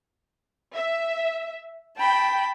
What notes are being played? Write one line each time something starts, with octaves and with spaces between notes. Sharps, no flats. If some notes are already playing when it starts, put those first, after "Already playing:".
E5
G5 A5 B5